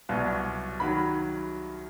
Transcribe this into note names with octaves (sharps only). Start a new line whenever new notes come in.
C2 B2 F#3
D#3 F#3 B5